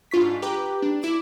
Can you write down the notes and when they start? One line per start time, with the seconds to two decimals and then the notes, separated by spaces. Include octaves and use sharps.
0.11 G#2 D4 F4 C#6 B6
0.42 G4 B4 G5 A#5 D6
0.82 D4
1.02 E4 D6 D7 E7